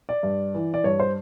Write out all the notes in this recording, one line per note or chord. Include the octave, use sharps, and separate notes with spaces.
D5
G2
E3
D5
G2 C#5
C5